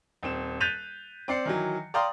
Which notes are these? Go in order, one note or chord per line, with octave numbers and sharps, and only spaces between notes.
D#1 C4 E7
F#6 G6 A6 B6 D#7 F7
C4 D5 C7 C#7
D#3 E3 F#3
D5 F5 G5 A#5 C6 D#6